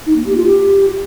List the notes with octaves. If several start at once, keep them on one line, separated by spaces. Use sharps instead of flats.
D#4
A#3
G4
F4
G4